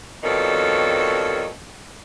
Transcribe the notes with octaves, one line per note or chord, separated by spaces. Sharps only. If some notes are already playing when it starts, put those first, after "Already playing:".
F2 B2 D#3 G3 A4 C#5